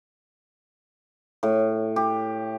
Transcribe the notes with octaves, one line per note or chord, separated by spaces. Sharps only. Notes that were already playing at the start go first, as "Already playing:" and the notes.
A2
G4